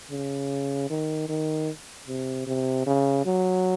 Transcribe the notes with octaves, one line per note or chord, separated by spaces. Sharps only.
C#3
D#3
D#3
C3
C3
C#3
F#3